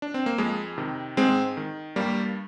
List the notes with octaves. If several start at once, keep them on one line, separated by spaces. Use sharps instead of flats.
D4
C4
A#3
F2 G#3
C3 D#3
G#2 G#3 C4
D#3
G2 G3 A#3